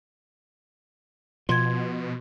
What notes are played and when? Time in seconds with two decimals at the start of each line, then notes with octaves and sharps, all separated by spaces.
1.49 B2 F3 C6 G#6